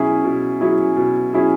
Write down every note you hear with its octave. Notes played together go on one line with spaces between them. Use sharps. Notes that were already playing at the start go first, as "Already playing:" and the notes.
Already playing: B2 F#3 C#4 E4 G#4
B2
F#3 C#4 E4 G#4
B2
F#3 C#4 E4 G#4